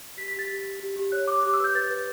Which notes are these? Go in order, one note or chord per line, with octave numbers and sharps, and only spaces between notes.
G4 B6
B6
G4
A6
G4
G4
G4
G4
C#5 F#6
C#5 D6
G4 D6
E6
B4 G6
B4 A6
B4